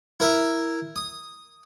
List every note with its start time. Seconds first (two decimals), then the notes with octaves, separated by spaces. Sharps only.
0.20 E4 A#4 E5
0.96 D#6